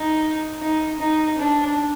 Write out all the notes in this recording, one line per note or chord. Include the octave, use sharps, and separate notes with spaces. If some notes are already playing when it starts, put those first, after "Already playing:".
Already playing: D#4
D#4
D#4
D4